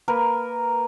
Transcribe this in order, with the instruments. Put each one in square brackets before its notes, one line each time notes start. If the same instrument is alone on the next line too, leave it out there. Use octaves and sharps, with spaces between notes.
[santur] A#3 A#4 B4